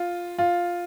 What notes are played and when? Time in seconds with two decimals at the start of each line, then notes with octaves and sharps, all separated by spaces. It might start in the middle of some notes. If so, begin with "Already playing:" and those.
Already playing: F4
0.38 F4